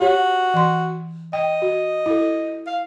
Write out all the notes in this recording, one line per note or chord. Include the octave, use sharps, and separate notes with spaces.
F#4 G4 C#5
E3 C6
D#5 G5
F#4
E4 A4
F5